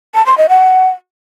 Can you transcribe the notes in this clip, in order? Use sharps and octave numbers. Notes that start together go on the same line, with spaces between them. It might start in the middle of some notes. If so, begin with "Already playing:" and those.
A5
C6
D#5
F#5